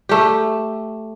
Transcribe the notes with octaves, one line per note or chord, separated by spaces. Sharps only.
A3 G4